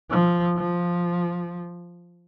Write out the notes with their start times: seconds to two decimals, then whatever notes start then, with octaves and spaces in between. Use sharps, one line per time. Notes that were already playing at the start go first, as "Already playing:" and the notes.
0.10 F3
0.57 F3